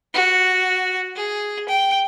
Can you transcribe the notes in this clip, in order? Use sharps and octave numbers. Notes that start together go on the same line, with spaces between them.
F#4
G#4
G5